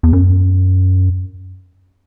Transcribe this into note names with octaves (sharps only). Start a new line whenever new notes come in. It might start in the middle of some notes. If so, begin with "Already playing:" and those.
E2
F#2